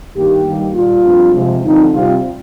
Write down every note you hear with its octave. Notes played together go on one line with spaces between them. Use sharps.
G2 D#3 A#3 G4
G2 D#3 G3 A#3
A#2 G3 A#3 F4
G2 F3 C4
C3 F3 G#3
G2 D3 F3 C4 D#4
C3 G3 C4 F4